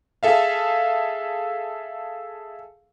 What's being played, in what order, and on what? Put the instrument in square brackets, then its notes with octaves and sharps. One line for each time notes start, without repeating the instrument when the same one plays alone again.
[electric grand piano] G#4 A4 E5 F5